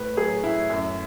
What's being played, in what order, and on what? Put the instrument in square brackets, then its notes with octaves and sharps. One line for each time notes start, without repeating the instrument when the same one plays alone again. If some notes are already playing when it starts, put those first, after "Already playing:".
Already playing: [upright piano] A2 B4
F#3 G#4
A2 E4
F#2